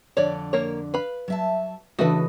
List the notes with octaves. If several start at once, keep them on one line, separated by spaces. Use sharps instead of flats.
F2 D3 D4 C#5 D5
A#3 A#4 C#5
B4 F5 B5
F#3 E5 A5
C#3 E3 A3 D4 F#4 A4 B4 D#5